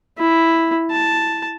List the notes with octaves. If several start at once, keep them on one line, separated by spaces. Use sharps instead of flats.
E4
A5